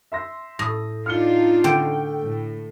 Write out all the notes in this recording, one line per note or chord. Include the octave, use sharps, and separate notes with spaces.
E5 C6 A#6
A2 D#6 A#6
D4 D#4 F4 F6 C#7 G7
D3 A3 C5 G5
A2